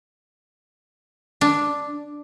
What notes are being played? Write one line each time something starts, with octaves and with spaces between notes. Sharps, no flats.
D4